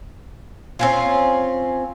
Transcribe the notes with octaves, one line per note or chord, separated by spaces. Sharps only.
C4 C#4 F4